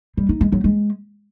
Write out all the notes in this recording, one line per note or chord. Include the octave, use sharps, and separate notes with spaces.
G3
D#4
G#3
F#3
G#3